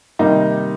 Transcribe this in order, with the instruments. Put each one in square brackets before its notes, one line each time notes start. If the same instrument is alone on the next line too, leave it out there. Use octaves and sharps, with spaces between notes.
[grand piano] C3 D#3 G3 A#3 D#4